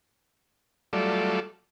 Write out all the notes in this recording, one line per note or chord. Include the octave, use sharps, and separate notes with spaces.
F#3 G3 A3 F4 A4 D5